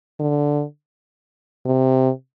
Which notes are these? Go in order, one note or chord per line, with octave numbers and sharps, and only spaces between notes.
D3
C3